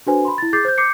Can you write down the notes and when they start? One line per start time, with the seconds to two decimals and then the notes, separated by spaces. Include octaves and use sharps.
0.07 D4 F#4 A4 B4 C5 G#5
0.25 B5 C6
0.38 E4 A6
0.53 G#4 D6 G6 A6 C7
0.65 C5 G6
0.78 D6 G6 C7 C#7